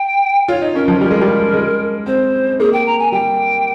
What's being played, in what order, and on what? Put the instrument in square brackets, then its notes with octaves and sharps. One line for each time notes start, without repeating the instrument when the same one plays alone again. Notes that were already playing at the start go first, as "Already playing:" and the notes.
Already playing: [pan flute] G5
[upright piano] F4 [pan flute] C#5
[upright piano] D#4
[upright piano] C#4 [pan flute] A#4
[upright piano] F3
[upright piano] G3 [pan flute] A#4
[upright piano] G#3
G3
G#3
[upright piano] C4 [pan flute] C5
[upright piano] A#3 [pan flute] G#4
[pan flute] G5
A#5
G#5
[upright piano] G3 [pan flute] G5